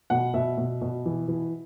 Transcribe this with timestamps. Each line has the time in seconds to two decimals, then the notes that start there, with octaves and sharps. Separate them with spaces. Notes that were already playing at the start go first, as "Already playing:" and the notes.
0.10 B2 F#5
0.34 B2 E5
0.57 B2
0.81 B2
1.06 E3
1.28 E3